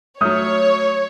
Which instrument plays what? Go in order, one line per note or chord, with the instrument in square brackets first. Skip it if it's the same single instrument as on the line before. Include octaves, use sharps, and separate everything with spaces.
[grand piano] F#3 A3 [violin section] C#5 [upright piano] D#6 F6 G6